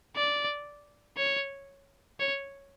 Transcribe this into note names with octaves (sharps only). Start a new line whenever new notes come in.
D5
C#5
C#5